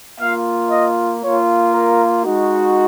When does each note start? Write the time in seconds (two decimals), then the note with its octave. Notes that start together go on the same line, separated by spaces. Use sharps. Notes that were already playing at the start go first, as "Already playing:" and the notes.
0.20 A#3 F4 F5
0.70 D#5
1.22 A#3 F4 C#5
1.73 A#4
2.25 G#3 D#4 F#4